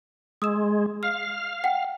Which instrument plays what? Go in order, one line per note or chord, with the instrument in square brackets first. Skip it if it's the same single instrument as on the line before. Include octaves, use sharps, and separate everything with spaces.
[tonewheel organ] G#3 [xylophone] D#6 E6 E7
[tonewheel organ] F5 [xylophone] F6
[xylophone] F#5 G5